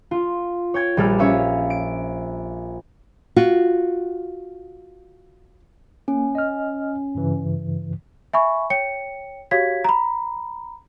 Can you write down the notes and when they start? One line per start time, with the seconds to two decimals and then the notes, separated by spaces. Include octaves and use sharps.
0.11 F4
0.74 C#5 G5 G#6
0.97 A#1 G3 A4 F6
1.18 C#4 C#5 E5 F5
1.70 D7
3.36 F4 F#4
6.08 A#3 C#4
6.35 D#5 F6
7.15 G2 C#3 E3
8.33 E5 G#5 B5 C#6
8.70 C#5 G5 C#7
9.51 F#4 G4 C#5 F5 G#6 B6
9.84 A#5 B5